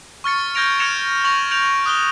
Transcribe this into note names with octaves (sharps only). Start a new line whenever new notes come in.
C#6 F6 A6 C#7
F6 G6 G#6 A#6 D7 F7
F6 G#6 A#6 C#7 E7 F7
C#6 A#6 F7 F#7
G6 D7 F7 F#7
D#6 F#6 G7